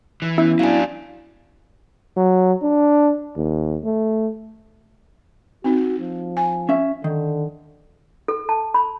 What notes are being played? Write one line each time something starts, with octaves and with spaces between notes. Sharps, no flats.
E3
B3 C#4 E4
F#3 D4 F5 G#5
F#3
D4
D#2
A3
C4 D#4 F#4
F3
G#5
C#4 E5
D3 D#3
A4
A5
B5